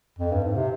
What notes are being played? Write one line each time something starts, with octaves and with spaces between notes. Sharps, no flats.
F2
G2
G#2
C3